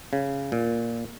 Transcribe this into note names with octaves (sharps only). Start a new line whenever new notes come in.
C#3
A#2